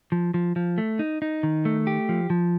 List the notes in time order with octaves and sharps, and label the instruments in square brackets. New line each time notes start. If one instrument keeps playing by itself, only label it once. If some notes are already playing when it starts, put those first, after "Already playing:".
[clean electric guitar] F3
F3
F3
A3
D#4
D#4
D#3
A3
G4
F3
F3